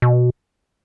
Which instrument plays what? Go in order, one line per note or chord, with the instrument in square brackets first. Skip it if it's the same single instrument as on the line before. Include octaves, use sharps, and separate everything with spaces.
[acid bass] B2